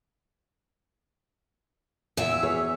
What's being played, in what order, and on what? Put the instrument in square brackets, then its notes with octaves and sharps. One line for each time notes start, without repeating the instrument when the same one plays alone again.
[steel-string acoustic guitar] E2 E5 [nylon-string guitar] A#2 G5
[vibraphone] E6
[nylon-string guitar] G#4 B4 C#5